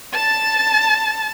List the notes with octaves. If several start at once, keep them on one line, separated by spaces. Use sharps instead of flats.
A5 A6